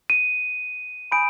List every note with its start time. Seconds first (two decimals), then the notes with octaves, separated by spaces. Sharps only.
0.10 D#7
1.12 G#5 B5 D#6 G6 D7